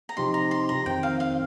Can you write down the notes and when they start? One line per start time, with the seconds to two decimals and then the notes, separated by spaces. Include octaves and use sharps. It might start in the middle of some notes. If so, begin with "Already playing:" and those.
0.09 A#5
0.17 C3 F3 D#4 G4 C6
0.34 A#5
0.51 C6
0.69 A#5
0.86 F2 D#3 C4 G5
1.03 F5
1.20 F5